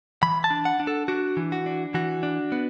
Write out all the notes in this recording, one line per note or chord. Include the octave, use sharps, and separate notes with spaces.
E3 B5
A5
D4
F#5
D4
A4
D4 F#4
E3
F#4
D4
E3 F#4
D4
B3